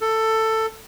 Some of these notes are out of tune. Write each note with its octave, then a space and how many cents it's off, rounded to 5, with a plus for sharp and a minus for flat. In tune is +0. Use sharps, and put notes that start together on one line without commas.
A4 +15